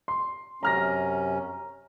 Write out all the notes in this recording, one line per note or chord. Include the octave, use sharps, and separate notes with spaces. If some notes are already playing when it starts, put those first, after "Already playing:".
C6
F#2 C3 C#4 A#5 F6 A#6